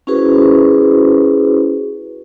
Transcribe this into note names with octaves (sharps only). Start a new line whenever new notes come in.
C#4 E4 F#4 G#4 B4 C5